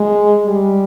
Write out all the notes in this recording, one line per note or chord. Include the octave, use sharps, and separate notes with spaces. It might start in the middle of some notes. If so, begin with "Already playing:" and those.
Already playing: G#3
G3